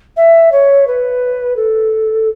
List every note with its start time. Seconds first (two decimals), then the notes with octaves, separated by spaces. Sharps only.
0.17 E5
0.52 C#5
0.87 B4
1.56 A4